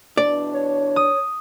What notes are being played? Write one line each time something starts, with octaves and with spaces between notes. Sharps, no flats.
E2 B2 D4 D5
C#5
D#6